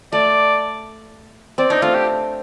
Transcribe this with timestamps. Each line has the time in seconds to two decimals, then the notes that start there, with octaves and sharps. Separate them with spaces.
0.12 A3 D5
1.58 C4 D5
1.70 D4 D#4
1.82 A3 C4 F4
1.94 G4